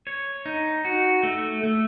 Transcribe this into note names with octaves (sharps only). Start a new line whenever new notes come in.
C#5
D#4
F#4
A3
A3